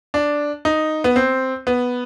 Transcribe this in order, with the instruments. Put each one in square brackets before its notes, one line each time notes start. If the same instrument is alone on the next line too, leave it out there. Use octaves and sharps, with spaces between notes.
[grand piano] D4
D#4
B3
C4
B3